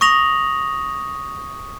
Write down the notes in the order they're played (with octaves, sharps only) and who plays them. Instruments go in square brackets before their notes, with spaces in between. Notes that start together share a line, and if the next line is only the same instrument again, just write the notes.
[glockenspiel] C#6 D#6 A#6 F7 F#7